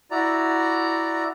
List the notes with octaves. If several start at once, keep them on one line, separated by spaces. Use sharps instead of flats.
E4 F#4 D5 A#5